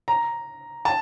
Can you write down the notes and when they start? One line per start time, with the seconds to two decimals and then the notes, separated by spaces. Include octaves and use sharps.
0.08 A#5
0.85 A5